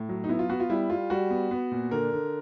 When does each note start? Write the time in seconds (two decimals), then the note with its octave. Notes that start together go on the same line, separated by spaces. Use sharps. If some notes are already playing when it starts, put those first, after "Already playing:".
Already playing: A2
0.09 F#3
0.24 D#4
0.29 B3 E4
0.39 F4
0.50 B3 F#4
0.60 F4
0.70 G3 E4
0.90 G3 F4
1.10 G3 F#4
1.30 B3
1.51 B3
1.72 A#2
1.91 D3 A#4
2.13 D3